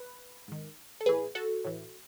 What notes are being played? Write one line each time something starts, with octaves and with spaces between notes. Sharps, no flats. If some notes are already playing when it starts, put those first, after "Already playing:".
Already playing: B4
G#2 D#3
A4
A2 E3 G#4 B4
F#4 A4
A2 E3